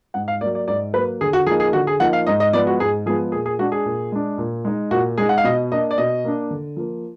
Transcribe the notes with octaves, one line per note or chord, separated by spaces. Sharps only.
G#2 F#5
F5
F#3 A#3 D5
D5
G#2 D5
F#3 A#3 B4
D3 G#4
F#4
F3 A#3 D#4 G#4
G#4
D3 F#4
G#4
F3 A#3 D#4 F#5
F5
G#2 D#5
D#5
F3 G#3 B3 D5
F#4
G#2 G#4
F3 G#3 B3 G#4
A#2 G#4
G#4
G#3 D4 F#4
G#4
A#2
G#3 D4
A#2
G#3 D#4
A#2 F#4
G#3 D#4 G#4
F#5
F5
B2 D#5
A#3 D4 D#5
D5
B2 D#5
A#3 D4
D3
F3 A#3